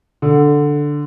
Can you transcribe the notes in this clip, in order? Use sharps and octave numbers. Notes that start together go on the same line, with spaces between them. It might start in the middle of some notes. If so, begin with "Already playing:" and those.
D3